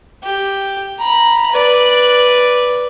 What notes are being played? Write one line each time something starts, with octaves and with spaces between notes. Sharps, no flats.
G4
A#5 B5
B4 D5